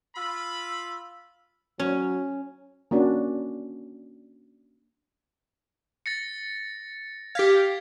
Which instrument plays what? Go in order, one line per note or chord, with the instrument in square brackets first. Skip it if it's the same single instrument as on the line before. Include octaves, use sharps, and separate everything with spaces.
[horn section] F4 B5 [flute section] E6
[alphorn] F#3 [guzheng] C#4
[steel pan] A#3 C#4 D4 F#4
[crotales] A6 A#6 C#7
[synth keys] G4 F5 [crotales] G#6 B6